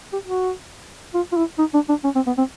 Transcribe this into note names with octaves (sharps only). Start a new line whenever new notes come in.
G4
F#4
F4
F4
E4
D#4
D4
D4
C#4
C4
B3
C4